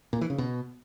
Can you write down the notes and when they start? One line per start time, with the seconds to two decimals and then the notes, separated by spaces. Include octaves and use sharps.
0.13 A#2
0.21 E3
0.30 C#3
0.38 B2